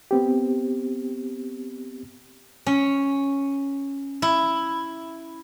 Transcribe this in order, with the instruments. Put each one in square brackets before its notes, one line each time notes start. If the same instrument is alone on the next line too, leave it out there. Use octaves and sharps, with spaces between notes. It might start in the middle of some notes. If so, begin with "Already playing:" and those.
[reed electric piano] B3 C4 G4
[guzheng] C#4
E4